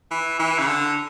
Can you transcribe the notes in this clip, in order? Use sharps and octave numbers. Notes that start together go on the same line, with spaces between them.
E3
E3
C#3
D3